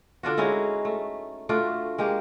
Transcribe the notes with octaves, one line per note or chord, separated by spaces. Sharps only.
D3 D4 F4 F#4
G#3 C#4 D#4 E4
A3
A3 D4 F4 F#4
G#3 A#3 G4